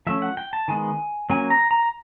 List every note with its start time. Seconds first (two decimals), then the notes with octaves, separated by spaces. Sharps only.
0.07 F3 A3 C#4 E5
0.22 F#5
0.37 G5
0.53 A5
0.68 D#3 G#3 B3 G#5
1.30 F#3 A#3 C#4 G#5
1.50 A#5
1.71 A#5